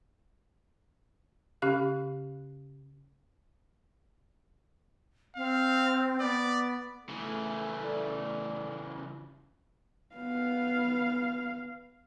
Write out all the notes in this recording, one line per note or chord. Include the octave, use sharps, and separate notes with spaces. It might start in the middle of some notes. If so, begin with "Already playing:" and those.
C#3 C#4 G4 F5 F#6
C4 F5
B3 D5
C#3 E3 A3 E4
D5
B3 F5